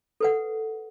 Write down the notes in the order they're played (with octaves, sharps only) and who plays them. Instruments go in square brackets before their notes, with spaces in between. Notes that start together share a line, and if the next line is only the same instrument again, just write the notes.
[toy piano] A4 B4 F#5